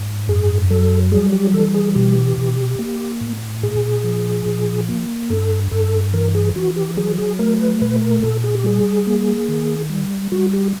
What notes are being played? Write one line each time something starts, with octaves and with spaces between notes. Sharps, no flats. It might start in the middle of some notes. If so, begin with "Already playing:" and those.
Already playing: G#2
F#2 G#4
F#3 A4
G3 G#4
G4
E3 A4
G#4
B2 G4
B2
A#3
A2
A#2 G#4
F3
A#2
A#3
G2 A4
G2 A4
E3 A#4
G#4
E3 F#4
G4
F#3 G#4
G#4
A3 A#4
B4
A#2 B4
A#4
A#2 A4
G#4
G4
G3 G#4
A#3
D#3
G3
G3 F#4
G4